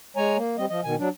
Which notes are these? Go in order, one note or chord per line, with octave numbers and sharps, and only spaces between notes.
G#3 C#5 G#5 A#5
A#3
G3 C4 D#5
F3 D#5
B2 D#3 G#5
F#3 D4